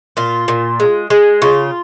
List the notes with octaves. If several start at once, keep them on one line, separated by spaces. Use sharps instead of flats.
A#2 F4
A#2
G#3
G#3
C#3 F4